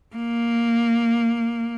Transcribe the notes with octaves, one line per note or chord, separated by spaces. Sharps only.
A#3